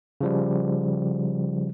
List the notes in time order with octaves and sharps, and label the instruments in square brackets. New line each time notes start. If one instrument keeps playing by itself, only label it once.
[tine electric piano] C#3 F3 G3